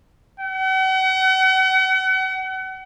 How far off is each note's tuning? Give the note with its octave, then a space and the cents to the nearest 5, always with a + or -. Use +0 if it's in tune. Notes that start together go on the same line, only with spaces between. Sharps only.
F#5 +40